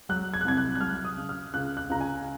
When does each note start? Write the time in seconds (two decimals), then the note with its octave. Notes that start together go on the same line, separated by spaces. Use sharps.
0.09 F#3 F#6
0.34 G#6
0.41 F#6
0.45 C2 G#6
0.57 F#6
0.75 F#6
0.81 F#3 F6
1.05 D#6
1.17 C#3
1.29 F6
1.54 C#2 F#6
1.77 F#6
1.90 C#2 A#5
2.01 G#5